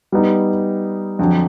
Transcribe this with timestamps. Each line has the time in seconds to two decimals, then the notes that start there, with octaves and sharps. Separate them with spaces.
0.12 G3 B3 D#4
1.19 F2 D3 F#3